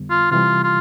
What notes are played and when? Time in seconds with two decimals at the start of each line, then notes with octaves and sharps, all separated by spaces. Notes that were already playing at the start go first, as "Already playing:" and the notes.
Already playing: F2 D3 G3 B3
0.10 F4
0.31 C3 E3 G3 F4
0.64 F4